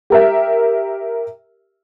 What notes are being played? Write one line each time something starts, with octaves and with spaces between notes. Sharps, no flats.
G4 A#4 E5